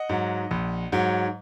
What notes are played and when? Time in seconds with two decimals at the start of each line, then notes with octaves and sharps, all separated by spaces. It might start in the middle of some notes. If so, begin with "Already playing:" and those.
Already playing: D#5 F#5
0.09 G#2 F#3
0.51 A#1
0.92 G#2 F#3